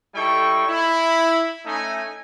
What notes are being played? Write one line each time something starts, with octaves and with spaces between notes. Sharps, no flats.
G3 D#4 E4 A4 G5 C#6
E4
A3 C#4 D#4 E5 G#5